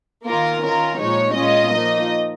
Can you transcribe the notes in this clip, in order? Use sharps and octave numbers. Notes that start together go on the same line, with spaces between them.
D#3 A#3 F4 A#4
D#3 C#4 F4 A#4
A#2 F3 G#3 D#4 C#5
A#2 G#3 C#4 F4 D#5
F3 A#3 D#4